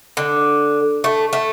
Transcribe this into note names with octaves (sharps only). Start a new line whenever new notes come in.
D3
A3
A3